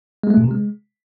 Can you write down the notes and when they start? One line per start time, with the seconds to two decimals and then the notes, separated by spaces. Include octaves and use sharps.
0.23 G#3
0.30 A3
0.37 A#2
0.44 C3
0.51 G#3